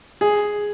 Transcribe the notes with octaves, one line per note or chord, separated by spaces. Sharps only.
G#4